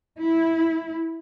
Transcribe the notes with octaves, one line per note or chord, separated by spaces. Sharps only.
E4